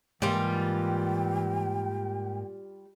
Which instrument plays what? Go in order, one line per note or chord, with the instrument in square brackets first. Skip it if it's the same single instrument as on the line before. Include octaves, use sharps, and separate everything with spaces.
[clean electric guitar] G#2 A#3 [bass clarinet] E3 [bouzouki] G3 F4 [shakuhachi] G5